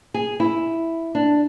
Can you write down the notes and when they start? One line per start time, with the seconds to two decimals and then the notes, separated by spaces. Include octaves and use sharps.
0.14 G#4
0.40 E4
1.15 D4